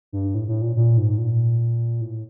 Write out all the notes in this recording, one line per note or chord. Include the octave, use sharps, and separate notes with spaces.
G2
A2
A2
A#2
A#2
G#2
A#2
A2